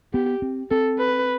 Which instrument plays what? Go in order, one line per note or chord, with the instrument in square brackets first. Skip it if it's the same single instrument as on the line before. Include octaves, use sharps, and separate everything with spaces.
[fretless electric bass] B3 [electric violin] G4
[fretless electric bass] C4
[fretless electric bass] C4 [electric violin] A4
[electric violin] B4